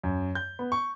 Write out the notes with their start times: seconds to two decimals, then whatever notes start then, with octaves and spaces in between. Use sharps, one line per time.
0.03 F#2
0.35 G6
0.59 B3
0.72 C#6